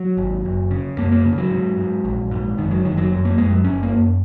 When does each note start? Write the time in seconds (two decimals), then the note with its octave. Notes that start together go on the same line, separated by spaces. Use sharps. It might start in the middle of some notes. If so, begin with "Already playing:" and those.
Already playing: F#3
0.17 G#1
0.45 F#1
0.71 C#3
0.98 F#2 A#3
1.12 A#3
1.25 C#3
1.32 D#3
1.38 F#3
1.51 G#2
1.78 G#2
2.05 A#1
2.31 G#2
2.58 F#1 D#3
2.71 F#3
2.84 F#1 D#3
2.97 F#3
3.11 F#2 F#3
3.25 A#3
3.38 F#2 G#3
3.51 F#3
3.64 F#1 C#4
3.83 A#3
3.92 F#2